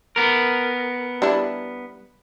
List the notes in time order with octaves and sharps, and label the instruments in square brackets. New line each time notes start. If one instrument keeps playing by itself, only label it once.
[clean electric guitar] B3 A#4
[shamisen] G3 D4 E4